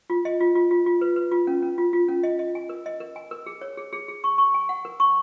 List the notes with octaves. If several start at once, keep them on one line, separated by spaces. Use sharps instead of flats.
F4
D#5
F4
F4
F4
F4
B4
B4
F4
C#4
C#4
F4
F4
C#4
D#5
D#5
G#5
A#4
D#5
A#4
G#5
A#4
G#4
C#5
G#4
G#4
G#4
C#6
C#6
G#5
F#5
A#4
C#6